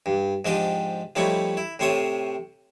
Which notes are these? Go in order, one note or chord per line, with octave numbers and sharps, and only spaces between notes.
G2
G#2 F3 D4 G4 D#5 G5
F3 G3 A3 D#4 E4 C#5
E4
A2 C3 C5 C#5 E5 D#6